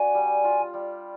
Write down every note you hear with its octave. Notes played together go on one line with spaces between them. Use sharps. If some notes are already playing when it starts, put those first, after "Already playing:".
Already playing: D4 F#4 G#5
G3
F4
G3